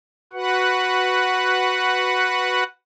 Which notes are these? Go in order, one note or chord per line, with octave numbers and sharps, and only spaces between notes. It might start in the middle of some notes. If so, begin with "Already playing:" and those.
F#4 B4 F#5